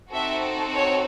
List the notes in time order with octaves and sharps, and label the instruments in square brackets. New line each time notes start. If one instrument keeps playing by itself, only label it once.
[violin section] C4 D#4 F#4 A4 E5
C#5